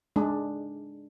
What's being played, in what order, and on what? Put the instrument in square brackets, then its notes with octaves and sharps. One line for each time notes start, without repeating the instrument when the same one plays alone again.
[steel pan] G#3 D4